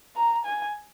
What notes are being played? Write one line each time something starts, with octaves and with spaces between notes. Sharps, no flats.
A#5
G#5